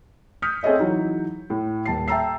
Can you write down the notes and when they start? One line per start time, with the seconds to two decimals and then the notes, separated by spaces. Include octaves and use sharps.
0.42 D#6 F6 G6 B6 C#7
0.63 C4 G#4 A4 C#5 D#5 E5
0.79 E3 F#3 D#4
1.50 A2
1.86 D#1 A5 C7
2.08 E5 G5 A5 A#5 E6 C7